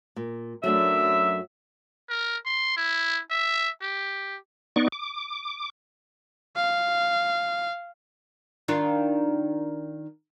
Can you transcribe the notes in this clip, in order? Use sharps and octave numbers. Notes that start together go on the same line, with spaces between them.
A#2
F#2 F#3 A3 D4 E5
A#4
C6
E4
E5
G4
B3 D#4 D5 C#6
D6
F5
D#3 D4 F4